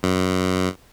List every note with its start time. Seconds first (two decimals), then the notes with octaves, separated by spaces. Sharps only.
0.03 F#2